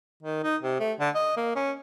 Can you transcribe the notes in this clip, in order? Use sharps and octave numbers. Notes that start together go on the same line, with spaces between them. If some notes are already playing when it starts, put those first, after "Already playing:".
D#3
D#4
C3
A3
D3
D#5
A#3
C#4